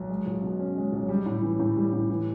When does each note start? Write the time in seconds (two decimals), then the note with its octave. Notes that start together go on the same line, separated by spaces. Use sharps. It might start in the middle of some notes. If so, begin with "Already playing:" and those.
Already playing: B1
0.09 G#3
0.26 B1
0.42 B2
0.60 C#4
0.76 G#3
0.92 B1
1.09 G3
1.26 A2
1.42 E3
1.59 A2
1.76 G3
1.93 A2
2.10 E3